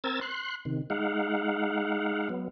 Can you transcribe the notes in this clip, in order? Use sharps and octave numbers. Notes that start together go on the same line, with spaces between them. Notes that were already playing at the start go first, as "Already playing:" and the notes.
C4 A#4 E6 G#6 A6
C6 F#6
C3 D#3
G#3 D#4 F5 F#5
F#3 B3